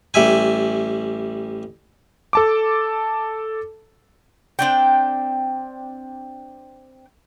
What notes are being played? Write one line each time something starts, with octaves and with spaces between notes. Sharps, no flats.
A1 G3 E5 G#5
A4 A5 D6
C4 D4 G5